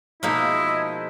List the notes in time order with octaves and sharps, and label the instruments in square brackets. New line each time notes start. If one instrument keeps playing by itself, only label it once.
[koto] B2 A#3 [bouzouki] F3 G#3 D#4 [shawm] E4 [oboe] D#5